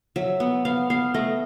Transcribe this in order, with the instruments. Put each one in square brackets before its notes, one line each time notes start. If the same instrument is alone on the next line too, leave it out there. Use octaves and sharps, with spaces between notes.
[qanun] F#3 E5
B3
B3 F5
B3 F5
A3 D#5